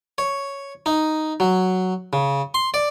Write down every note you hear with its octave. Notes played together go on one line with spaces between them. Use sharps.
C#5
D#4
F#3
C#3
C6
D5